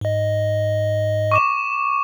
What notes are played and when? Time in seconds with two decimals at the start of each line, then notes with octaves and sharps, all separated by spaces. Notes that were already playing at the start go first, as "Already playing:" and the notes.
0.01 G#2 D#5
1.31 C#6 D6 E7